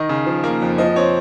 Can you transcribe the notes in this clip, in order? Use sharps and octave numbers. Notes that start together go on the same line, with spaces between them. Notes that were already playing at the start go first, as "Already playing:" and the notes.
Already playing: D#3 D#5
C#3
F3
A#3
F2
F3 D#5
C4 C#5